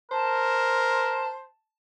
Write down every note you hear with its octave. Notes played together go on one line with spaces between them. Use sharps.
A#4 C5 A5